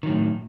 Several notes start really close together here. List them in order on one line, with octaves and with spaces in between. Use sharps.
D#3 F#3 A2